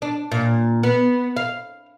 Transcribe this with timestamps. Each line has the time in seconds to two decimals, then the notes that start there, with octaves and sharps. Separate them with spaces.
0.02 D4
0.32 A#2
0.83 B3
1.37 F5